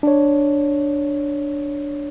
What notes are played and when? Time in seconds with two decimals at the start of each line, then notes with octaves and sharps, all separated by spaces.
0.03 D4 C#5